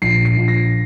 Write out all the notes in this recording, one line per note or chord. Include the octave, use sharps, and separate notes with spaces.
A#1 C7
C7
A#1
A#6